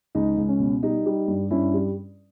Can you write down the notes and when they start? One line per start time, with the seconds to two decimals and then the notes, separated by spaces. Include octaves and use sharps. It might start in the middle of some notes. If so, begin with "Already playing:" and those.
0.15 C#2 D#4
0.38 C#2
0.48 C#4
0.60 B2
0.83 G3 D#4
1.06 G3
1.28 G2
1.51 G2 C#4 E4
1.74 G3